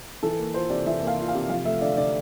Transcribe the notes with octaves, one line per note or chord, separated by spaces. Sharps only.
E3 A4
A#3
F4 C5
C3 D5
E3 E5
A#3
F5
F4
F5
C3
F3 F5
A3 E5
D3 D5
D3 D5